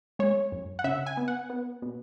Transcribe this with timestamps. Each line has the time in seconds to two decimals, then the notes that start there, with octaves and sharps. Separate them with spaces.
0.19 G#3 C#5
0.52 F#2
0.79 F#5
0.84 C#3 E5
1.06 G#5
1.17 B3
1.28 F#5
1.50 B3
1.82 B2